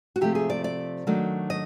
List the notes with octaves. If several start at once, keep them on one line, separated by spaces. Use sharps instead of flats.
F#4
C3 F3 A3 G4
G#4
D5
D5
D#3 F#3 A3 D4
D#5